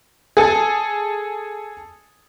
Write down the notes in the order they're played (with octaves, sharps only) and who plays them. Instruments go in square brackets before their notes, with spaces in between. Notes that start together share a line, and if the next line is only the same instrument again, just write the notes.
[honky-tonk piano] G#4 A4